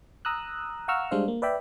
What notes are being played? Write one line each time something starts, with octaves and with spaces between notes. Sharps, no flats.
A#5 D#6 E6 F#6
F5 F#5 A#5 C#6 E6 F6
G3 G#3 D4 C5 F5
A#3
B4 D5 E5 G5 B5